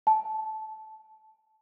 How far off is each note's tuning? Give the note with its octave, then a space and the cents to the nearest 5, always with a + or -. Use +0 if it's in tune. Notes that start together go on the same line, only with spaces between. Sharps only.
A5 -15